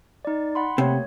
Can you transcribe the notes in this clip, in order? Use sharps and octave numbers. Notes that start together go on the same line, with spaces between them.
D#4 D5
F#5 B5 C6
C3 A3 A#3 C#5